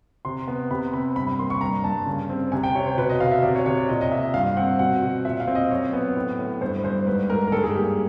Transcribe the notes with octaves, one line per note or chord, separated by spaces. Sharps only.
C3 C6
B3
C3 B5
C4 B5
G2 B5
B5
A#3 C6
C#6
G2 A#5
G2 A5
C#3
C4
C3 G#5
G5
C3 C#5
C5
B2 B4
D#5
B2 F5
E5
C3 D5
C#5
C3 C#5
D5
A#2 D#5
D#5
A#2 E5
G2 F5
C4 F#5
B2 F#5
B2
A#2 E5
F5
C4
D#5
F#2 C#5
B3
A2
A2
G2 C5
G2 C5
G#2 B4
G#2 A#4
A#4
G2 A4
G#4
A#3 G4